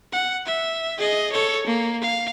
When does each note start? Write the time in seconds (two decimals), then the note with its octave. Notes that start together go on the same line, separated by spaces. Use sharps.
0.12 F#5
0.46 E5
0.98 G#4 D#5
1.32 A4 C#5
1.67 A#3
2.01 F5